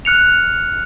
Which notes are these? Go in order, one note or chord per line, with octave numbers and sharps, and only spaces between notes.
F6 F#6 C#7 F7